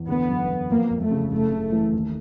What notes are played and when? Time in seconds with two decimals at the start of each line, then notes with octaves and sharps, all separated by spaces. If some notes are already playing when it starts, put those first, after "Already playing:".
Already playing: E2
0.08 D3 B3
0.29 F#2
0.50 F#2
0.70 F2 A#3
0.90 F2
1.01 A3
1.11 C#3
1.31 F#1 A3
1.52 C#3
1.72 E3
1.93 D#2